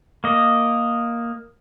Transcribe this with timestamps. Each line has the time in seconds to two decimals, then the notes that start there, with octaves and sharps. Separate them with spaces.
0.24 A#3 D#5